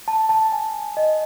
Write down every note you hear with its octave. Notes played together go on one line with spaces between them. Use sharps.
A5
A5
G#5
D#5